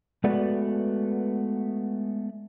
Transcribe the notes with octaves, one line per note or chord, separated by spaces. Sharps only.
G#3 A3 B3 F#4 B4 D5